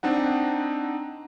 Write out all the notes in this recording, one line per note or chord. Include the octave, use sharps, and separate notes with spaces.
C4 D4 D#4 F#5